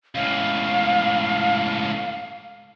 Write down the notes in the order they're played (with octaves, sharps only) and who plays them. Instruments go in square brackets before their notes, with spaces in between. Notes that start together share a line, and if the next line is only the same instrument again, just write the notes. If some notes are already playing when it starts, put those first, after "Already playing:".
[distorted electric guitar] C#2 A2 [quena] F5